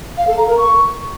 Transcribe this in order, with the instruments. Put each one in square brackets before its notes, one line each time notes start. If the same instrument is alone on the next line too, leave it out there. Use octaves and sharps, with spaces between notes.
[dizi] F5
A4
A#5
A#4
C#6